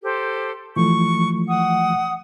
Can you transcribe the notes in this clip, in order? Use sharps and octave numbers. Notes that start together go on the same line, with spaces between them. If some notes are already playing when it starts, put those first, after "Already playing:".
G4 A4 C5
E3 F3 A3 C#6
F#5 D#6